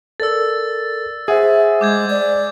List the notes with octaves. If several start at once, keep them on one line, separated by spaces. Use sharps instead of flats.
A4 A#4 D5 E6 A6
G#4 C5 E5 F#5 G#5
G#3 D6 G6 G#6
D5